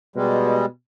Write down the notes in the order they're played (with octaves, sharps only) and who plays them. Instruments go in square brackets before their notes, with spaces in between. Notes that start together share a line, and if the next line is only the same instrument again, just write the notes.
[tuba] B2 [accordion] G3 G#3